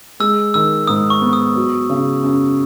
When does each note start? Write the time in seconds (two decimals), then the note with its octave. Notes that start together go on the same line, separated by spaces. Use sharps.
0.20 G#3 E6
0.54 D#3 E6
0.87 G#2 D#6
1.10 C#6
1.21 B3
1.33 D#6
1.56 F#3
1.90 C#3
2.24 F#2